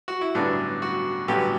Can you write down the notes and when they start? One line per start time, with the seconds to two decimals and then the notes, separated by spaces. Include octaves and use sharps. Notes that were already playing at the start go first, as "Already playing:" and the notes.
0.08 F#4
0.21 E4
0.35 A1 G2 D3 F#3 B3 D4
0.82 F#4
1.28 A1 G2 D3 F#3 B3 G4